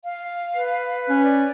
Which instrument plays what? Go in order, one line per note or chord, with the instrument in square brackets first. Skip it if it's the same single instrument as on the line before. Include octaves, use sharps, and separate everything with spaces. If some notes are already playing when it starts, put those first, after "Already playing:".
[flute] F5
[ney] B4
[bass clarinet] C#4 [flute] F#6
[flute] D5